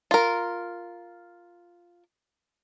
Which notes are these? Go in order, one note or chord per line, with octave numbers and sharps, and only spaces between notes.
F4 A#4